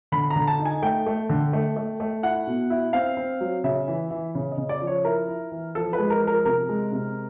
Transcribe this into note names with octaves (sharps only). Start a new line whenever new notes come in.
D3 B5
A#5
D3
A5
D#4
G#5
A3 G5
A3
D3
A3
A3
A3
E4 F#5
B2
E4
C4 F5
C4
F#3
C#3 E5
E3
E3
C#3
D#5
C#3
D5
F3
C#5
E4 A#4
E4
E3
F3 A4
B4
G#3
A#4
F3
A#4
C3 A#4
G#3
C3